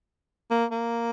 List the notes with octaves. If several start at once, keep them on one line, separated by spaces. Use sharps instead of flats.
A#3
A#3